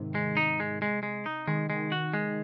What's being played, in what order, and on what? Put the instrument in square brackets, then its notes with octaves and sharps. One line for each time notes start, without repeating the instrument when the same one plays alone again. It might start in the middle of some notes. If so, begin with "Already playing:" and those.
Already playing: [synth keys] G#2 C3 D#3
[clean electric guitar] G#3
D#4
G#3
G#3
G#3
D#4
[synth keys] D#3 [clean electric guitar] G#3
[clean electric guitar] G#3
F#4
G#3